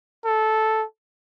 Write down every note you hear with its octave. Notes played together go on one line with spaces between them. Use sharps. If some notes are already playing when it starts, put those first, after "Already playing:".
A4